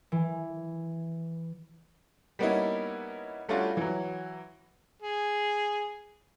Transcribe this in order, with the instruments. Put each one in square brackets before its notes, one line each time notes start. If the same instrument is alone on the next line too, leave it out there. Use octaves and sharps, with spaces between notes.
[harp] E3
[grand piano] G3 A#3 B3 C#4 D#4 E4
G3 A3 C#4 D4 F4 F#4
E3 F#3
[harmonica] G#4